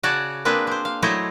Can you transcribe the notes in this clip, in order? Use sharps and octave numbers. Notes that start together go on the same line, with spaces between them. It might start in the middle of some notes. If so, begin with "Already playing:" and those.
C#3 F#4 C#5 D5 F#5 A5
A#3 C4 D4 G#4 B4
C4 C5
F5
F#3 A3 E4 C5 C#5 D#5